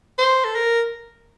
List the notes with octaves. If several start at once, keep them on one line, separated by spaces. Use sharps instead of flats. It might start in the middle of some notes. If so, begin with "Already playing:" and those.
C5
A4
A#4